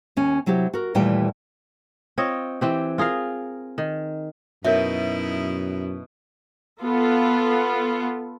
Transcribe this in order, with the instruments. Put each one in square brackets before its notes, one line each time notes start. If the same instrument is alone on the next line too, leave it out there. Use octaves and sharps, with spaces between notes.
[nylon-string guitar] D#2 C#4
C3 F#3 E4 G4
F#4 A#4
D#2 A#2 E3 G3 A3 G5
[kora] C4 F4 C#5 D#5
E3 C4 G4
F4 G#4 A#4 F5
D#3
[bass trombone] F#2 [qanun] B2 [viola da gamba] D#4 E4 [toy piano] A#4 C#5 E5
[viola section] B3 F4 A4